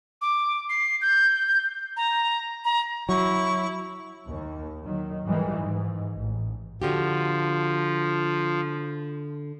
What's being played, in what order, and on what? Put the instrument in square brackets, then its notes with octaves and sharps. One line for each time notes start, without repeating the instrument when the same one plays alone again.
[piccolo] D6
C7
G6
A#5
A#5
[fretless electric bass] F#3 [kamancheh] E4 [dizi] C#6
[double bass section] D#2
D#3 F#3
G#2 D#3 E3 G3 G#3
G#2
A1
[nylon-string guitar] D3 F#4 G4 [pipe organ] F3